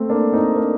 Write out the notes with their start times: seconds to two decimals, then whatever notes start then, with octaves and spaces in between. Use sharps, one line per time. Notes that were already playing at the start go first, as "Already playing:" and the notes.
Already playing: A3 C4
0.10 A#3 D4
0.33 C4 D#4
0.56 A#3 D4